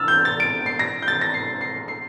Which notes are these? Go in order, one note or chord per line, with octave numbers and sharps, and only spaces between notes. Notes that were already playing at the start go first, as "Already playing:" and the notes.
Already playing: E6 F6 A6
G6
A6
D7
C7
A#6
G6
A6
A#6
C7
C7
C7